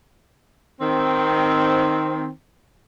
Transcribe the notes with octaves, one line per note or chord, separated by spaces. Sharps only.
D#3 C4